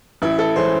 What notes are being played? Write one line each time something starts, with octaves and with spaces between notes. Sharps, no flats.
A1 E4
A4
E3 G#3 C#4 C5